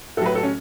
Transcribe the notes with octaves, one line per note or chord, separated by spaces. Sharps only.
A2 F#3 A4 B4
A4
C#4